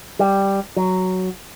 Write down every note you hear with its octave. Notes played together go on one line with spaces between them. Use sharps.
G3
F#3